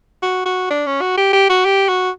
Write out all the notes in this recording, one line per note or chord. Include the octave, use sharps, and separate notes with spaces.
F#4
F#4
D4
C#4
F#4
G4
G4
F#4
G4
F#4